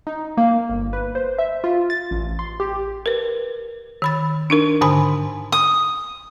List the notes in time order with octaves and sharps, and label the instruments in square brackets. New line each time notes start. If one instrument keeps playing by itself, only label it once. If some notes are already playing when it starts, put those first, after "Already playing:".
[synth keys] D#4
A#3
G1
B4
C5
E5
F4
A6
A1
C6
G4
[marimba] A#4 B4
D#3 B5 A6
D4 D#4 A#4
G#2 D3 G#5 B5 C6
[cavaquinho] D#6